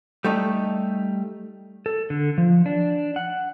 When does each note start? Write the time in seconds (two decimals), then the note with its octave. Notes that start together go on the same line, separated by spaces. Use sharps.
0.25 G3 A3 D#4
1.86 A4
2.10 D3
2.38 F3
2.66 D4
3.16 F#5